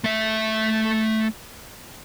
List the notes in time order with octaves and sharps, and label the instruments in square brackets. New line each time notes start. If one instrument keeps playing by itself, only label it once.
[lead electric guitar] A3 E5